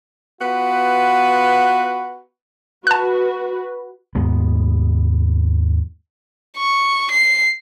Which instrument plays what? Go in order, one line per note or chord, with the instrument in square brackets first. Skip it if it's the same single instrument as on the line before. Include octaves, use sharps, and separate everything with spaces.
[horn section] B3 F4 F#4 B4
[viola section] F#4 B4 [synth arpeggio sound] A5 F#6
[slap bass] D#2 G#2 G#3 B3
[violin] C#6
C7